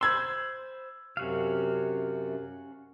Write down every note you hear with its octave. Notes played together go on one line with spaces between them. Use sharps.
C5 B5 C6 E6 G#6
F#2 C3 C#4 F#4 F5